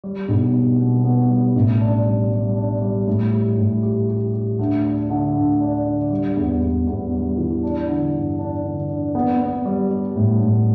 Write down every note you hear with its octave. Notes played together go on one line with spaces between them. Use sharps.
G3
B1
B2
B2
B3
G3
A1
D4
G3
G3
D4
G3
A2
G4
A2
G4
G4
G4
D2
D4
D3
D2
D4
D3
G3
E2
E2
E2
G3
E3
D4
D3
G2
D4
D3
D4
B3
B3
G3
G3
A2
A2